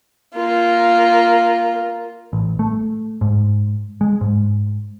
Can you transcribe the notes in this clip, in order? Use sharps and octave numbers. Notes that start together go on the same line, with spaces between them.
A#3 F4
A1
A3
G#2
G#3
G#2